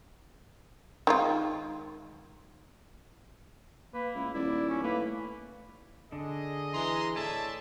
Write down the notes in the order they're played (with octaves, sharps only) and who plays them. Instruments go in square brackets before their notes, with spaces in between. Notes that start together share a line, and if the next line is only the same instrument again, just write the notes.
[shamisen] D#3 G#3 F4
[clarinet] A#3 [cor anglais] B4
[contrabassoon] C#2 [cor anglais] E4
[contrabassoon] D#1 [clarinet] E4 [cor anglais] D5
[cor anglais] C#4
[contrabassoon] A2 [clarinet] A#3 [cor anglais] B4
[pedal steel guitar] D3 D4 [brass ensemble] G#4 D#5
[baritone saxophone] E3 [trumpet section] G#3 A#5 C6
[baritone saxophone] A2 [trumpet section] D5 E5 A5 [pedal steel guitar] G#5